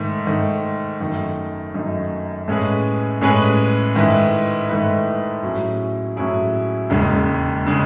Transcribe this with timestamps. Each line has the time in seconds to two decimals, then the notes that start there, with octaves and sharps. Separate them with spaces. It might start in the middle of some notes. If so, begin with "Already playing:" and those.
Already playing: G#2 D#3 A3
0.27 G#2 D#3 A3
1.00 F#2 D#3 A3 D#4
1.74 F#2 D#3 A3 D#4
2.48 A2 G#3 C#4 G#4 B4
3.21 A2 G#3 C#4 G#4 B4
3.95 G#2 D#3 A3 E4 B4
4.69 G#2 D#3 A3 E4 B4
5.43 A2 F#3 C#4 E4 G#4
6.16 A2 F#3 C#4 E4 G#4
6.90 E1 D#2 C#3 G#3
7.67 C#3 G#3